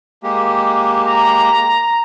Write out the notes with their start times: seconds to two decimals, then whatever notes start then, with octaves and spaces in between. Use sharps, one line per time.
0.23 G#3 A#3 G4
1.05 A#5